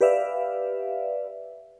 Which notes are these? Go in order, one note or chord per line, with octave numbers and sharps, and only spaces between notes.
G4 B4 D5 E5 F5